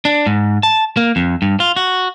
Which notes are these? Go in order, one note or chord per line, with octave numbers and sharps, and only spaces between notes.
D4
G#2
A5
A#3
F2
G2
F4
F#4